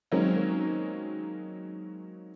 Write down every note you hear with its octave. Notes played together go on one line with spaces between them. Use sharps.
D#3 F#3 G#3 A#3 C4 C#4